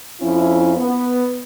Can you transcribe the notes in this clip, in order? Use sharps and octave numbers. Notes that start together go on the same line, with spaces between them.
F2 F3 C#4 E4
B3